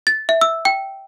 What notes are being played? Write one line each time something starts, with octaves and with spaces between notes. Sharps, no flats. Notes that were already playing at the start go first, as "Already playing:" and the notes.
A6
E5
E6
G5